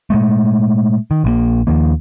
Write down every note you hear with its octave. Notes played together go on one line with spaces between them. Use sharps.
A#2 G#3 A3
D#3
A#1 D3 A#3
D#2 D#3 F3 A#3